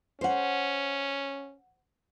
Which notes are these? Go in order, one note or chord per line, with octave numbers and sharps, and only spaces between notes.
C#4 C5 F#5